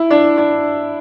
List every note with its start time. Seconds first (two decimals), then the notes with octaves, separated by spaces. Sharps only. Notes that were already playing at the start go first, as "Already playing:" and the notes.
Already playing: E4
0.10 D4
0.37 D4